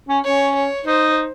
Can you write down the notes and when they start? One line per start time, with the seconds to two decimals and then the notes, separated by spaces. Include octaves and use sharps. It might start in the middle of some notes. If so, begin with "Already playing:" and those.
0.09 C#4
0.24 C#4 C#5
0.54 C#5
0.85 D#4 C5